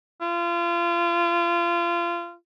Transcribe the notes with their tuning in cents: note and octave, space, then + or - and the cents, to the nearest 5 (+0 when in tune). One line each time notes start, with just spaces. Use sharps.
F4 -30